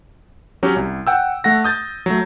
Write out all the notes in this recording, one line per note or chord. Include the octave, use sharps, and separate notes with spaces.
F#3 C#4 G4
C2
F#5 G5 E6
A3 F#5 A#6
D#6 G6 A6
F#3 A3